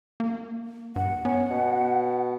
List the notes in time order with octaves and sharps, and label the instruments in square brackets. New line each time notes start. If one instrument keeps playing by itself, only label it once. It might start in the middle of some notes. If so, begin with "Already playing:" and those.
[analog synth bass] A#3
[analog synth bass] G2 [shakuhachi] F#5
[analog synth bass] B3 [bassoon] C#4
[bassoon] B2